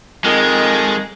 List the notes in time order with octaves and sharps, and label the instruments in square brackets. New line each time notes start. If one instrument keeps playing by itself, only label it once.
[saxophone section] F2 D#3 [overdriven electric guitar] G#3